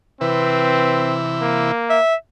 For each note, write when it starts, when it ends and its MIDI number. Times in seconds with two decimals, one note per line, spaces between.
0.21 1.72 48
0.21 1.72 52
0.21 1.16 60
0.21 1.72 64
0.21 1.25 71
1.42 1.99 58
1.90 2.15 76